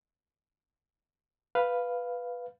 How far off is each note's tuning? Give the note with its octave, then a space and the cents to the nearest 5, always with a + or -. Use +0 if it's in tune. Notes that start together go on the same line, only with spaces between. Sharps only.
B4 +0 F5 +0